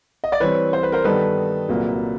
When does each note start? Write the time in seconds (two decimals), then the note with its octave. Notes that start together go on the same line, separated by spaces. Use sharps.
0.24 D#5
0.32 D5
0.40 E3 G3 C4 B4 C#5
0.73 C5
0.83 B4
0.92 A#4 C5
1.04 G2 D#3 G3 B3 D#4 A4 B4
1.69 C2 A#2 F#3 A#3